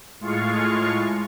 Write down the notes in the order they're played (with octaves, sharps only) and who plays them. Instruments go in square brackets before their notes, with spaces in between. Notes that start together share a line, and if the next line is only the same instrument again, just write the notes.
[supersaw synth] A2 G#3 F4 F5 C#6